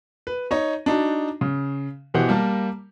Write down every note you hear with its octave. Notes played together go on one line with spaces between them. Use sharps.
B4
D#4 C#5 D#5
D4 D#4 F#4
C#3
B2 E3 G4 C5 F#5
G3 A#3 A#4 A5